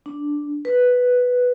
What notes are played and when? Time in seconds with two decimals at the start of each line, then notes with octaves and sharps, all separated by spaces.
0.06 D4
0.65 B4